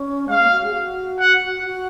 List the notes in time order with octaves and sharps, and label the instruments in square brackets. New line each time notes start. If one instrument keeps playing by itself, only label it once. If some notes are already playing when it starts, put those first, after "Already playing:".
Already playing: [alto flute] C#4
[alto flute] G#3 [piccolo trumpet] F5
[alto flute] A#3
F#4
G#4
F#4
[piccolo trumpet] F#5
[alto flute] F#4